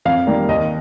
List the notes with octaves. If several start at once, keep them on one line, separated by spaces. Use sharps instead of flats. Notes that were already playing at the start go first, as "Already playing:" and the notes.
F2 F5
D#3 G3 A#3
D#2 D#5